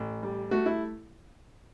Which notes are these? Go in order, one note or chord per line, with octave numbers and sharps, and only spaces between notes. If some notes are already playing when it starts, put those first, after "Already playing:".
Already playing: A1
G3
A3 F#4
E4